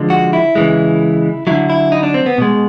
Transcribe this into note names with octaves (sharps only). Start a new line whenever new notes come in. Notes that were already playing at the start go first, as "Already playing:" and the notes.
Already playing: D3 F3 G#3
F#4
E4
C#3 E3 G#3
D3 F#3 E4
E4
D#4
D4
C4
B3
B2 G#3